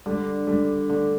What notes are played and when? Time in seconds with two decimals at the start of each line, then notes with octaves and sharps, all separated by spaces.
0.06 D3 G3
0.47 D3 G3
0.90 D3 A3